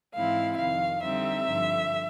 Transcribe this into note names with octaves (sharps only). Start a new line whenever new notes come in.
G#2 E3 G#3 C4 E4 F5
F2 C3 D#3 F5
D3 G3 C4 D#4 E5
G2 D3 F3